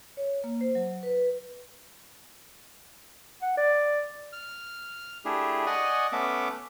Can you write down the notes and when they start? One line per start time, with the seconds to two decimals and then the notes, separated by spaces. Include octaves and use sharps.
0.17 C#5
0.44 A#3
0.61 C5
0.75 F#3
1.03 B4
3.42 F#5
3.57 D5
4.33 F6
5.25 A3 D4 E4 G4 G#4
5.66 D5 D#5 F#5 G#5 C#6 D#6
6.12 A3 B3 C#4 E5 F#5 D6